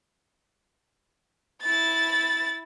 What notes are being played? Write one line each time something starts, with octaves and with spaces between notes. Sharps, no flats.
E4 A6